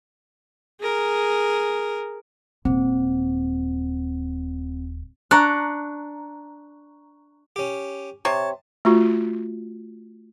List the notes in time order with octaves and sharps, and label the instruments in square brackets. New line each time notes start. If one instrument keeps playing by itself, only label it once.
[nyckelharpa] G#4 A#4
[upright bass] D#1 [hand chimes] C4
[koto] D4 [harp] A#5 C#6 F#6
[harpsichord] C#4 G4
[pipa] C3 [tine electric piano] C#5 [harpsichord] A5
[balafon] A3 F4 F#4